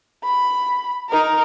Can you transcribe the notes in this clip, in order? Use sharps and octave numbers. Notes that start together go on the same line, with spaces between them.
B5
D#4 A#4